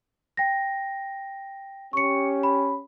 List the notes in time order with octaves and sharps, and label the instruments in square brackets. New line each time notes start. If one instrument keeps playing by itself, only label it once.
[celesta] G5 A#6
[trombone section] C#4 G4 [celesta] C#6 C#7
[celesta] B5